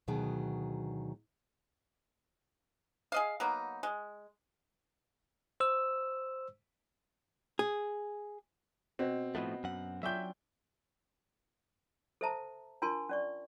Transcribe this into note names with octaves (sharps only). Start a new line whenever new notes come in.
D2 B2 D#3 F#3 G#4
G#4 D#5 F5
F#3 A#3 B3 D#4
G#3
C5 E6
G#4
B2 C4
A2 F3 A3 B3 D#5
F#2 F#5
F#3 C#4 D4 F4 E5 G5 G6
A4 C5 E5 A5 A#5
D4 F4 A#4 G#5 A5 C6
C#4 D5 C#6